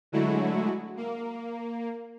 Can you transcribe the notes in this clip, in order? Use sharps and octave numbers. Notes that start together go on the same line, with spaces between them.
D3 F#3 G#3 A3 E4 F#4
A#3